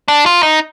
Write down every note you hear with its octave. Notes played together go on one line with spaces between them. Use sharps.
D4
F4
D#4